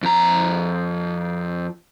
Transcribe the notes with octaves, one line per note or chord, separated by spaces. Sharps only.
F2 A#5